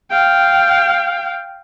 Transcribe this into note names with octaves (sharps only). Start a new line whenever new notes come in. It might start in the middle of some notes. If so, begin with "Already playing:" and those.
F5 G5